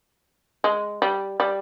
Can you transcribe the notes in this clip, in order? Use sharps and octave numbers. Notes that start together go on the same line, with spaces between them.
G#3
G3
G3